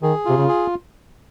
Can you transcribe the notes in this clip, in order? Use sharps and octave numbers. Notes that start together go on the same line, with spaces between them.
D#3 G#4
C3 F4
C#3
G#4